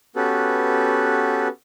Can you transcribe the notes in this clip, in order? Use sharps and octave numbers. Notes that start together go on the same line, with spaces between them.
B3 C#4 F#4 G4 A4 B4